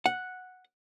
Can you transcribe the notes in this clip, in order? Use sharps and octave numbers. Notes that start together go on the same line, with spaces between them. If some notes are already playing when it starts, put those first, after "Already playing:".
F#5